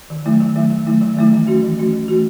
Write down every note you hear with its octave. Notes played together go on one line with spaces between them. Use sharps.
D#3
F#3 A3 E4
D#3
F#3 A3 E4
D#3
F#3 A3 E4
D#3
F#3 A3 E4
E3
A3 C#4 F#4
E3
A3 C#4 F#4
E3
A3 C#4 F#4